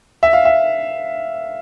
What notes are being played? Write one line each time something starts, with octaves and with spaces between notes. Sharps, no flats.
E5
F5
E5